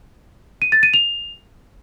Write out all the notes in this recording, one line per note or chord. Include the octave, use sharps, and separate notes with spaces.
D#7
A6
D#7
F7